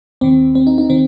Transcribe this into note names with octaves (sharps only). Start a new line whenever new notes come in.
D#2 D#3 C4
C4
D#4
D#4
D#3 C4